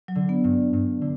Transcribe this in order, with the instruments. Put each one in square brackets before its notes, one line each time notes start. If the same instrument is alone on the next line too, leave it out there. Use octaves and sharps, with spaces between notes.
[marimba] F#3
[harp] D3
[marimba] B3
[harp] G2
G2
D3